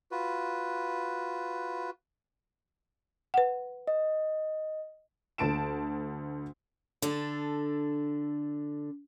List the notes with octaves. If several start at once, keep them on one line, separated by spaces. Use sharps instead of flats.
F4 F#4 B4
B4 F#5
D#5
D2 A5 D7 E7
D3 D4 A4